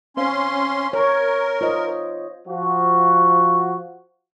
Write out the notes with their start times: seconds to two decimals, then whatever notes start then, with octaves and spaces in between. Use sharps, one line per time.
0.17 C4 C#4 C5 F5 C6
0.93 A#4 C#5
1.61 F4 C5 D#5
2.48 F3 F#4